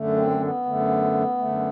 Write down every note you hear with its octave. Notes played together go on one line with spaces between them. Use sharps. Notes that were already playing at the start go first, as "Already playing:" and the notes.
Already playing: F#2 D3 A3
C4
A3
B3
F#2 D3 A3
F#2 D3 A3